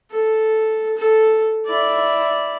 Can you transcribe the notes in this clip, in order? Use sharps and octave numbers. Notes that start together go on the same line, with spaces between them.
A4
A4
E4 D5